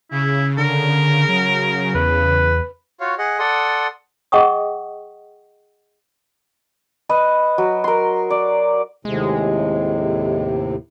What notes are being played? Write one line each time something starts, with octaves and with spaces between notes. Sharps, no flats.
C#3 E4
D3 A#4
F#3
E2 B4
F4 F#4 C#5 F5
G#4 D#5 F#5
A4 D5 F#5 C6 D#6
G#4 D#5 F#5 G5 C#6 D#6
B4 D#5
F#3
A#4 C6
D5
D#2 A2 C3 G#3